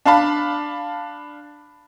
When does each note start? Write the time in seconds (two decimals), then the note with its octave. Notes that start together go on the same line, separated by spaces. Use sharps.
0.06 D4 F5 A5 B5